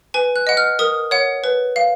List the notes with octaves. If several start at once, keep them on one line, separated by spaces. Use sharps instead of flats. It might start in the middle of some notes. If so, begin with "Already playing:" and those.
B4 G#5
F#6
D#5 F#5
F6
A#4 D#6
C#5 F#5
B4
F5